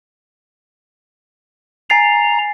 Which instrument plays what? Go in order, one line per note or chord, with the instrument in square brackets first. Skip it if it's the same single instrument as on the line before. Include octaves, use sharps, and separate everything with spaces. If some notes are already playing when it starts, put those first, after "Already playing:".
[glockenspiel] G#5 A6 C7 [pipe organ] A#5